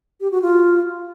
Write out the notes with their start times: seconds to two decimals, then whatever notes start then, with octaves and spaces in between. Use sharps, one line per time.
0.20 G4
0.31 F#4
0.42 F4